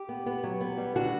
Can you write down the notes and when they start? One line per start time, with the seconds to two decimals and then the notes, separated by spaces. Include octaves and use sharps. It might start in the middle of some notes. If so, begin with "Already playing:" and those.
Already playing: G4
0.09 B3
0.26 B3
0.44 F#3
0.61 B3
0.78 G3
0.95 D3 F#4